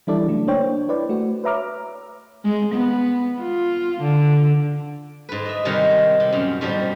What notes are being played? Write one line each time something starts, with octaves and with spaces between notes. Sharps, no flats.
E3 G3 D4 E4 A4 D5
C#3 F#3 A3
A#3 D4 C5 C#5 G5
E4 B4 C5 D5
A3 F#4
B4 C#5 E5 A#5 D6 F6
G#3
B3
F4
D3
G#2 B4
D#5 E5
C3 D#3 G3 G#3 F5 F#5
C3
F#2 A#2
G#2 B2 F3 G3